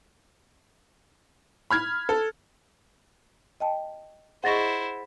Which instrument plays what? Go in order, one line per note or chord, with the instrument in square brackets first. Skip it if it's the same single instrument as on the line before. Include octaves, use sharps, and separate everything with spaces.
[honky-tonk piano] B5 F6 G#6
A4
[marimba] D#5 G5 A5
[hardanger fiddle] E4 C5 [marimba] G#4 D#5 C#6 [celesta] F#5 A6 A#6